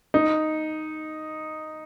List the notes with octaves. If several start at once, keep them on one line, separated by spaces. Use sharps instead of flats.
D#4